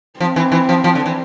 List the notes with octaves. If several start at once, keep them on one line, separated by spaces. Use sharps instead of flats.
F3 C4
E3
E3
F3
F3
D3
E3